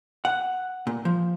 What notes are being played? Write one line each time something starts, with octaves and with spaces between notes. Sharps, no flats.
F#5
A#2
F3